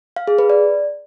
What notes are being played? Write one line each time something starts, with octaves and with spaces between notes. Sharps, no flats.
F5
G#4
B4
D5